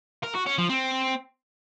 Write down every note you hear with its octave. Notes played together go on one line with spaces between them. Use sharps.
A#4
F#4
C#4
F3
C4